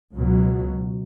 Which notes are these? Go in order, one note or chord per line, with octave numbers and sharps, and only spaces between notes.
C#2 B2 F#3